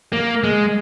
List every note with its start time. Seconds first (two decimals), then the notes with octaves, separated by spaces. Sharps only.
0.13 A#3
0.44 G#3